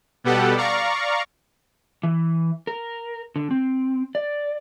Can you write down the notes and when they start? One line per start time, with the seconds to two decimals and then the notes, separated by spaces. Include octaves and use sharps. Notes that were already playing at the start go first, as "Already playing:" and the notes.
0.24 B2 G3 B3 G4 A4 F#5
0.57 D5 F5 A#5 C#6
2.03 E3
2.67 A#4
3.36 D3
3.51 C4
4.15 D5